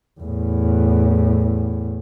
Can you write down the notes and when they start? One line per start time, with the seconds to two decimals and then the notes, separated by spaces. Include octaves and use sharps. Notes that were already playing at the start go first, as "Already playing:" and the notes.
0.20 E2 A2